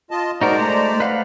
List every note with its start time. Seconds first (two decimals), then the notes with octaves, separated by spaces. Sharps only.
0.11 F4 D#5 A5
0.41 G#3 D#4 F#4 A#4 C5 D5
0.59 A3 A#5
1.00 B4 F5 F#5